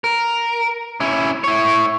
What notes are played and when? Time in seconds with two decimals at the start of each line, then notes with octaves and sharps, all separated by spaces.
0.04 A#4
1.00 C#4 E4
1.44 E4 C#5